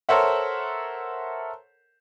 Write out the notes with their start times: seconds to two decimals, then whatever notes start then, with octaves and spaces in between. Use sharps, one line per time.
0.09 A4 A#4 C5 C#5 E5 F#5